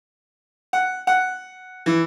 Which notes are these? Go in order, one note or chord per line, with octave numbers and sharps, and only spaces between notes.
F#5
F#5
E3